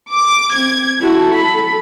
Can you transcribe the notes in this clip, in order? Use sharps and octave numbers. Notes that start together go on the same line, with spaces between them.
D6
C4 G#6
E4 F#4 A4
B5